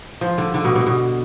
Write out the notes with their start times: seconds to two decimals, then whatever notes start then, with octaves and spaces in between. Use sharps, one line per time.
0.21 F3
0.38 D3
0.54 D3
0.65 B2
0.75 B2
0.87 B2